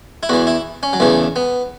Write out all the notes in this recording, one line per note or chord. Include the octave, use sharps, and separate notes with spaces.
E4
E2 E3 F#4
E4
C#4
F#3
E2 C#3 E3 A3
B3